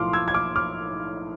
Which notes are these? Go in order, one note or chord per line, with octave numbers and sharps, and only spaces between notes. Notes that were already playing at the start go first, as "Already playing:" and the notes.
Already playing: B1 A2 F3 C6 D6 F6
E6 G#6
G#6
D6 F6
D6 F6